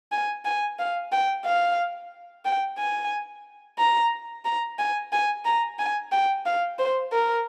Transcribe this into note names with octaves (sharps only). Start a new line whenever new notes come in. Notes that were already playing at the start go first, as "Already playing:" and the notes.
G#5
G#5
F5
G5
F5
G5
G#5
A#5
A#5
G#5
G#5
A#5
G#5
G5
F5
C5
A#4